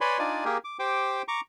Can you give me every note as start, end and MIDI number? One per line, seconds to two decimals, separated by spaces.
0.01 0.19 71
0.01 0.19 73
0.01 0.19 74
0.01 0.19 80
0.01 0.19 83
0.01 0.19 84
0.19 0.44 62
0.19 0.44 63
0.19 0.44 65
0.19 0.44 74
0.19 0.44 80
0.45 0.58 58
0.45 0.58 67
0.45 0.58 68
0.45 0.58 70
0.64 0.77 86
0.79 1.22 67
0.79 1.22 72
0.79 1.22 79
0.79 1.22 86
1.28 1.41 82
1.28 1.41 85
1.28 1.41 86